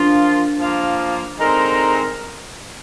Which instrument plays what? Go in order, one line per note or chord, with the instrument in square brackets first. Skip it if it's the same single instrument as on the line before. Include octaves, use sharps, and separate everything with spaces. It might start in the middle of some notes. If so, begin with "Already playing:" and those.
Already playing: [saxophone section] F3 A#3 F4 [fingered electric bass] D4
[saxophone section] F3 A#3 F4
D3 G#3 C4 D#4 A#4